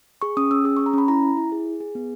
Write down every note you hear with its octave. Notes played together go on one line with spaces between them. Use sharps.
G#4 C#6
C#4 D#6
C#4 E6
G#4 D#6
C#6
C#4
A#5
C#4 B5
E4 A#5
E4
E4
G#4
G#4
G#4
B3